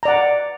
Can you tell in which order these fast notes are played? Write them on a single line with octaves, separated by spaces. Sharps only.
A#5 D5 F#5